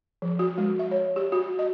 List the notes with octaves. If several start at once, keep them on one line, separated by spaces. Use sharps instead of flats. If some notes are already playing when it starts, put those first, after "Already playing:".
F3
F#4
G#3
E5
C#5
G4
F#4
D#5